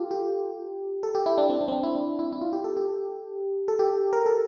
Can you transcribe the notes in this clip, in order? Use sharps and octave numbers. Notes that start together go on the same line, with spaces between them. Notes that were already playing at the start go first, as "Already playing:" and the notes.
Already playing: F4 G4 A4
G4
A4
G4
E4
D4
C4
D4
C4
D4
E4
D4
E4
E4
F4
G4
A4
G4
A4
G4
A#4
A4